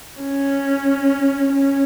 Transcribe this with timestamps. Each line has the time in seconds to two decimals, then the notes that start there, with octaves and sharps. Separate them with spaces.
0.23 C#4
1.53 C#4